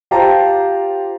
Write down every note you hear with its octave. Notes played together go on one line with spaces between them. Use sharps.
F4 G4 C5 G5 A5 A#5